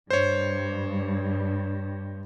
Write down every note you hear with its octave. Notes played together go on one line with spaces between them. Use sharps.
G2 C5 C#5